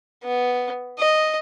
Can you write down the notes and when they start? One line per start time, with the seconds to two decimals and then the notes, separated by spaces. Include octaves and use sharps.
0.24 B3
0.99 D#5